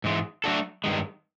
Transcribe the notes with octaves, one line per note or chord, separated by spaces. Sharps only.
G#2 E3 G#3
F#3 A3 D4 F#4 A4
G2 D#3 G#3